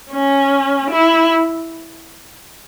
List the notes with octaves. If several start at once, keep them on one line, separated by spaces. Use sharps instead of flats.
C#4
E4